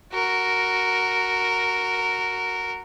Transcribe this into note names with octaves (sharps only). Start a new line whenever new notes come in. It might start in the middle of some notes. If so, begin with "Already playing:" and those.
F#4 A#4